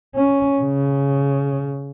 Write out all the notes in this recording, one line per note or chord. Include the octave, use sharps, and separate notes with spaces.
C#4
C#3